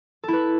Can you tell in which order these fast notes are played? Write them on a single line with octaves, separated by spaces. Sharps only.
A4 E4 B4